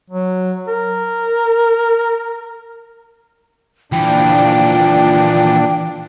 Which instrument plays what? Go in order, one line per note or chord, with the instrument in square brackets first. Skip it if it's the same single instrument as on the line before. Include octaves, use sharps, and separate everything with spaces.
[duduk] F#3
A#4
[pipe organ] A#2 D4 [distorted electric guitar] E3 F3 [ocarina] G5